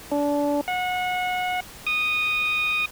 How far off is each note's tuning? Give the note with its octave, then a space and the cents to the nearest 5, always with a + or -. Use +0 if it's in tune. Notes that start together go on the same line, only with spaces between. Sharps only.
D4 -25
F#5 -25
D#6 -10